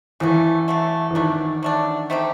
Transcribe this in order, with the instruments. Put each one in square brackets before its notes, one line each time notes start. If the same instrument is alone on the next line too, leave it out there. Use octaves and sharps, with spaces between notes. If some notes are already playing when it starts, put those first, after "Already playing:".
[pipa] C#3 F#3 A3 [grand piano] E3
[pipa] C#3 F#3 A3
[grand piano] E3
[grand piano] D#3 [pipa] F#3 A3 D4
[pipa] F#3 A3 D4
A3 C4 D#4 G4